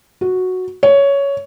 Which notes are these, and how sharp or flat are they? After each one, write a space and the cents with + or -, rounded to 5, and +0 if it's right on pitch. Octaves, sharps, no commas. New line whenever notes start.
F#4 -5
C#5 +10